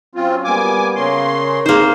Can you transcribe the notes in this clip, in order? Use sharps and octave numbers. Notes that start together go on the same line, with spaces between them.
F#3 C4 C#4 F4
G3 A#3 B3 G#5 D6
C#3 A#4 C#5 C6
A#3 C4 D#4 G#4 C5